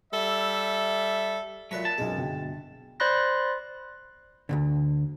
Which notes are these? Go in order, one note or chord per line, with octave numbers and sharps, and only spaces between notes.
G3 A4 E5
A#2 F#3 A3 B4 B5
A5
B1 F#2 B2 G#3
G1 B2 G5
C5 D5 B5 C6 F#6 A#6
D2 G#2 D3